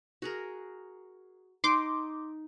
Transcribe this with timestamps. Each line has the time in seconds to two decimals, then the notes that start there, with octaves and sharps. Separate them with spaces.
0.22 F#4 G#4 A#4
1.64 D#4 C6 D6